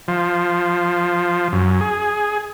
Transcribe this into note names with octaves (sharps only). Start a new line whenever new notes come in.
F3
F#2
G#4